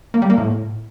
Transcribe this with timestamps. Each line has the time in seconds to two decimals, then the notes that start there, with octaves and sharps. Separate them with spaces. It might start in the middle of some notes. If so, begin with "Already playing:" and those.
0.14 A#3
0.22 G3
0.30 A#3
0.38 A2